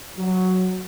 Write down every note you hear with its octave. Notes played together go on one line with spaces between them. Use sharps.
F#3